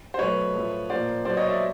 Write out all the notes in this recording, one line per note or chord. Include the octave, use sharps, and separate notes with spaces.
C5
B2 F#3 A3 B4 C#5
A2 F3 A3
A#2 F3 A#3 C5 D5
B2 F#3 A#3 C5 D5
C#5 D#5
D5 E5